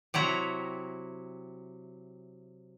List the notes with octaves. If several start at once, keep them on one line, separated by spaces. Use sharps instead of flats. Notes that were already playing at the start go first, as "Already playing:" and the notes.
C3 F#3 E4 A#5